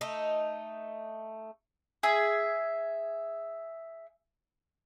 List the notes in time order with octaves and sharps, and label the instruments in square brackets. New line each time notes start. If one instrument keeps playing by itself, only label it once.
[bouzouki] A3 D#4
[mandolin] G#4 E5